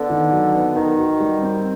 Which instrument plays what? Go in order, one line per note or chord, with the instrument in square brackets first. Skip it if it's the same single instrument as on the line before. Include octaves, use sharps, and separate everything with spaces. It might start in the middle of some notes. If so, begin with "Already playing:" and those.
Already playing: [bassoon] D3 [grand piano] B3
[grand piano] D#3
F#3
B3
[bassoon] D#3 [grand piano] D#4
[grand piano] F#4
G3
C4